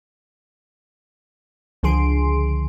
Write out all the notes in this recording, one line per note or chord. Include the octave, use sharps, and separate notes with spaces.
C#2 D3 F3 G#4 C6 D7